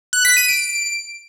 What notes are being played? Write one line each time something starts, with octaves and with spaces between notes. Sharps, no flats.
F#6
B6
D#7
D7